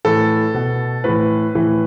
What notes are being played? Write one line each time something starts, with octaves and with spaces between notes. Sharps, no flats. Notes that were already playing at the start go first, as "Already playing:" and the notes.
A2 E3 A4
B2
A2 E3 B4
A2 E3